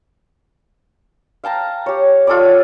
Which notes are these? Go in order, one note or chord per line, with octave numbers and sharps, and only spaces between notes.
F5 G5 A5 A#5
G4 C#5
F4 A4 C#5 D5